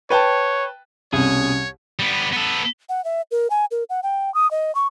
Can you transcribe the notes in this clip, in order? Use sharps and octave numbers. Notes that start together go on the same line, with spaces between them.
B4 C#5 G5 A5
C2 B2 C#4 G#4 C#5
G3 B3
B3 A4
F#5
E5
A#4
G#5
A#4
F#5
G5
D#6
D#5
C#6